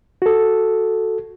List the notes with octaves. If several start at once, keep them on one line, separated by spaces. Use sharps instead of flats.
F#4 A4